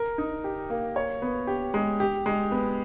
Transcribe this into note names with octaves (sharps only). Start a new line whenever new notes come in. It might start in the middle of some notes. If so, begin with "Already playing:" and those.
Already playing: A#4
D#4
G4
A#3
C#5
B3
G4
G#3
G4
G#3
B3